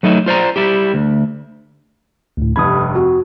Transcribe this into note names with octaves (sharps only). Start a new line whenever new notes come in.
F#3 A3 D#4 E4
F4 C5 D5 A#5
G3 E4 G4
D2
D2 A2
F1 G2 B5 D#6 G#6
F2 F#4